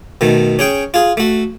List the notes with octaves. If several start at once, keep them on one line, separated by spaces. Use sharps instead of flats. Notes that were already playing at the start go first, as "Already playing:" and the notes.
B2 D#3 A3
C#4 G#4 G5
F4 G#4
A3 F#4